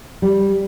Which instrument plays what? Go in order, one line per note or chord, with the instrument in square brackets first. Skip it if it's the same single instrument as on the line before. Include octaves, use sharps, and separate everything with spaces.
[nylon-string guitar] G3